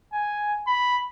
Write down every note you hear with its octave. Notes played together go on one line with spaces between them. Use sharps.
G#5
B5